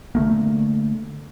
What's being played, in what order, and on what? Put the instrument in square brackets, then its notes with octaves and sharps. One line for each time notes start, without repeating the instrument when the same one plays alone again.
[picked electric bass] D3 A3 A#3